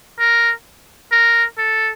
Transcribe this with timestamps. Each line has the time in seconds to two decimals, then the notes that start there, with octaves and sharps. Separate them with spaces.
0.19 A#4
1.12 A#4
1.58 A4